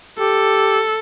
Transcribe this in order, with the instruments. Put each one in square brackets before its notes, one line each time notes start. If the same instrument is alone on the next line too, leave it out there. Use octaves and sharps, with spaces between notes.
[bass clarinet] G4 [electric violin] A4